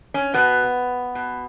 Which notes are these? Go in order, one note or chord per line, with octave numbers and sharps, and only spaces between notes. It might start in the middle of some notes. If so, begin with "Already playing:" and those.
C#4
B2 B3
B2